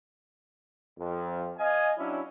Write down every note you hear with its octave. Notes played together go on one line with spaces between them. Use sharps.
F2
D#5 F5 G#5
F#3 C#4 D4 E4